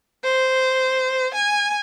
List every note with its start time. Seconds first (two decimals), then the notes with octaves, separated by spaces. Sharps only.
0.24 C5
1.34 G#5